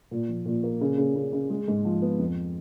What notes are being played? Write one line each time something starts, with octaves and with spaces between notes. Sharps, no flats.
A#2
F3
A#2
A#3
C#3
C#3
C#3
C#3
G#3
G#2
F3
B3
F2